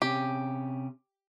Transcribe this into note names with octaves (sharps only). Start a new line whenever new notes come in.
C3 C#4 G4